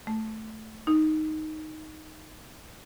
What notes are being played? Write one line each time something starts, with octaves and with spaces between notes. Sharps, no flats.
A3
D#4